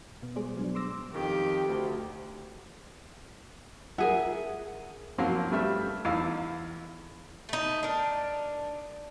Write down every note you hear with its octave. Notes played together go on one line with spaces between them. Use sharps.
B2 B3
G3 G#3 G#4 C5 D5
F#3 G#3 B3 D4
C6 D6 E6 A#6
F2 D#3 G4
D2
G#4 A#4 E5 F#5
F3 F#3 A#3 C4 A#4 F5
G2 G3 A3 E5 F6
E2 D#4 F5 E6
A3 D#4
D4 A#4